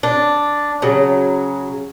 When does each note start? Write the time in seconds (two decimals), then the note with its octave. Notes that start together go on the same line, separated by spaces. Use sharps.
0.03 D4
0.82 C#3 F#3